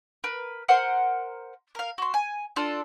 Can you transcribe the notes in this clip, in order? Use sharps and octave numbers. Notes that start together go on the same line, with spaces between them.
A#4 B4
A#4 C5 F#5 C6
A#4 F5
F#4 C6
G#5
D4 F4 A4